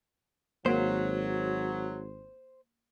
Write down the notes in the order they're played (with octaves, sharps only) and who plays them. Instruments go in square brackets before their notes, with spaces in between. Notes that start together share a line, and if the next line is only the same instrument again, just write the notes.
[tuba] G#1 [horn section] F#3 [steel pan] A#3 [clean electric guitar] C5